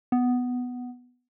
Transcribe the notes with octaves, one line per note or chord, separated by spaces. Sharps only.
B3